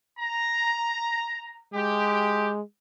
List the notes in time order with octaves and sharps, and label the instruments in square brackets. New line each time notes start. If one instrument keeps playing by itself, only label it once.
[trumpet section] A#5
[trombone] G#3 [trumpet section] G4